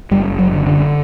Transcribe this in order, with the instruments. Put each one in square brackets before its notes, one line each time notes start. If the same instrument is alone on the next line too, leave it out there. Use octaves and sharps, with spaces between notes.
[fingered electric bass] F#1 G3
F#3
D3
D3